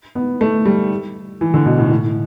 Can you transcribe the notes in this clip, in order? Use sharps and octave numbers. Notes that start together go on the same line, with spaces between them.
B3
A3
G3
E3
D3
B2
A2
A2